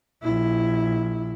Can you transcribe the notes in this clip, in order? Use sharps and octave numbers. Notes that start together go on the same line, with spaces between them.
A#1 E4